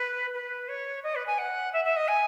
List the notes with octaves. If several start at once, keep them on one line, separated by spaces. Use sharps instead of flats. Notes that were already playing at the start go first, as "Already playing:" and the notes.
Already playing: B4
B4
C#5
D#5
B4
G#5
F#5
E5
E5
D#5
G#5